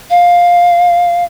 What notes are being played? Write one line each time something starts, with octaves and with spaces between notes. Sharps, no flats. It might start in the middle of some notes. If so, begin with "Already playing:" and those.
F5